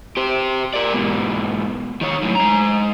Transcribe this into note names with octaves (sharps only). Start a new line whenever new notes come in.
G4 C5
A#4 D5
G#2 B2
D#3 C#5
F#2 A2
G#3 A#5